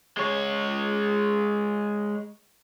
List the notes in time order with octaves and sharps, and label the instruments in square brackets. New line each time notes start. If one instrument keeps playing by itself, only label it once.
[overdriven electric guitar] G#3 C#5